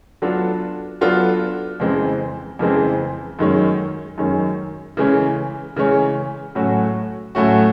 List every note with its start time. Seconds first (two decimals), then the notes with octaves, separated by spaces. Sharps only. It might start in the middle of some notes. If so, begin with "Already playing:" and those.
0.22 F#3 B3 D4 F4 A4
1.01 F#3 B3 D4 F4 A4
1.80 F2 C#3 E3 G#3 C4
2.59 F2 C#3 E3 G#3 C4
3.39 F#2 D#3 G#3 C#4
4.18 F#2 D#3 G#3 C#4
4.97 C#3 E3 G#3 C#4
5.77 C#3 E3 G#3 C#4
6.55 A2 F#3 A3 C#4 F#4
7.35 A2 F#3 A3 C#4 F#4